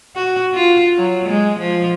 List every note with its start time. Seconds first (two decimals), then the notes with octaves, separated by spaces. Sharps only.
0.16 F#4
0.54 F4
0.98 F#3
1.28 G#3
1.59 F3